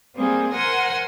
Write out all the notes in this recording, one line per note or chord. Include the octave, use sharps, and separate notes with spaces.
G3 A#3 C4 G#4
A#4 C5 F#5 G#5 C6 A#6